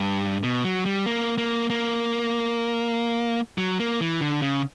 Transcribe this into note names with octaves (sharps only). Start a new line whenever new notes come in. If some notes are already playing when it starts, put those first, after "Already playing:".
Already playing: G2
B2
F#3
G3
A#3
A#3
A#3
F#3
A#3
E3
D3
C#3